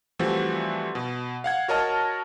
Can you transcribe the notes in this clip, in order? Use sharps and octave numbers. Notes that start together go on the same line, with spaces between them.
E3 F3 G3 A3 C4 F#4
B2
F5 F#5 G#6
F#4 A#4 C#5 D#5 A5 F6